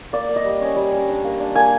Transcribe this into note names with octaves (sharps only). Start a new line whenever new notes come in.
A#3 D5
A#3
D#5
G3
C#4
G3
C#4
D4
A#3
D4
A#3 G#5